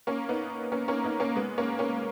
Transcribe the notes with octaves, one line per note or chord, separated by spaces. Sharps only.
A#3 C#4
B3 D#4
A#3 C#4
A#3 C#4
B3 D#4
A#3 C#4
G#3 B3
A#3 C#4
A#3 C#4